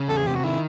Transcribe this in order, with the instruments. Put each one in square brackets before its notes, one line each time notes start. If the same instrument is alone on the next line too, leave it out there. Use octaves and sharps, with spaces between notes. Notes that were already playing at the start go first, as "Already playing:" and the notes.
Already playing: [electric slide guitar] C#3
[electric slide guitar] E2 [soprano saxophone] A4
[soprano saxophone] G#4
[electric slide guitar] C3 [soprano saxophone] G4
[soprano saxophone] F#4
[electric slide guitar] D#3 [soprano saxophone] E4